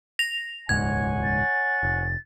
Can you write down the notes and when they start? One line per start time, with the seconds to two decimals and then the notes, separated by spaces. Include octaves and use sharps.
0.19 A#6 F7
0.69 D#1 C#2 G#2 C#5 F#5 G#5 G#6
1.23 A6
1.83 F1